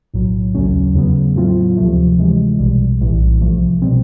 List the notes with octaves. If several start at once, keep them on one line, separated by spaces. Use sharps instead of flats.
B1 A2 F#3
D#2 C#3 F#3 A3 C#4
E2 C#3 F#3 B3
A2 F#3 A3 C4 F4
D2 C3 F3 A3
C3 E3 G#3
B1 B2 G3
A#1 A2 E3 G3
C2 C3 F3 A3
B2 G3 C4